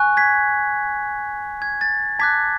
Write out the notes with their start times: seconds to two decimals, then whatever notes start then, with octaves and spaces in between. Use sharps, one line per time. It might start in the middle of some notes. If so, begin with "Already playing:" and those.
Already playing: G#5 C#6 F#6
0.17 G#6 B6
1.62 G#6
1.81 A6
2.19 A5 D6 F#6 G#6 B6